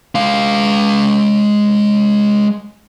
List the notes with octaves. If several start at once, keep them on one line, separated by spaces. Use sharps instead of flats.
G#3 F5